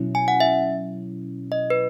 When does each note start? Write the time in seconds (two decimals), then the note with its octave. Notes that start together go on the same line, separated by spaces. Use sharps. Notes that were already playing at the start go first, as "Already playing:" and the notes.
Already playing: B2 F#3 C#4 E4
0.15 G#5
0.28 F#5
0.40 E5
1.52 D#5
1.70 B4